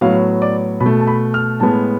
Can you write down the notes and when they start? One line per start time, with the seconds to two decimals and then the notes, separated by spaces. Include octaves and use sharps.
0.01 A2 F#3 B3 F5
0.42 D5
0.80 B2 B5
0.86 A3
1.00 A5
1.07 B5
1.34 F6
1.60 A2 G#3 B3 A5